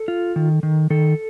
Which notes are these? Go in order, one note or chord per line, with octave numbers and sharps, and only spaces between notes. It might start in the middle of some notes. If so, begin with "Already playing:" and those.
Already playing: A4
F4
D#3
D#3
D#3 A4